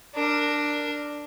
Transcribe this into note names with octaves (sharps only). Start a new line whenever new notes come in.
D4 A#4